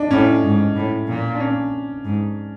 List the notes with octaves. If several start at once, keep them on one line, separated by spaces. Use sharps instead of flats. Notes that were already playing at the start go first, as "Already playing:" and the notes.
Already playing: D4 D#4
A2 C#4
G#2
A2
A#2
D4
C#4
G#2